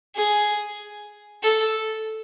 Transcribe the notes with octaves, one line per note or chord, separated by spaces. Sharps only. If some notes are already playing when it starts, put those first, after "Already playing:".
G#4
A4